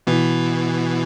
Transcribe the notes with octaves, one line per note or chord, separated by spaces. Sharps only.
B2 E3